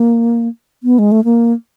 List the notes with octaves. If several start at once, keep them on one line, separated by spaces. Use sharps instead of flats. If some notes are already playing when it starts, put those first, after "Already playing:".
Already playing: A#3
B3
G#3
A3
A#3